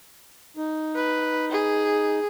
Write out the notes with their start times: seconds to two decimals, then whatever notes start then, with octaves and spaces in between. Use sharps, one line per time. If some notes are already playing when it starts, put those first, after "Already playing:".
0.57 D#4
0.96 B4
1.51 G#4